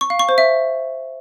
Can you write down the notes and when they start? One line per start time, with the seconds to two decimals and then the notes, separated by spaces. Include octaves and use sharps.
0.01 C#6
0.10 F5
0.19 C#6
0.29 C5
0.38 E5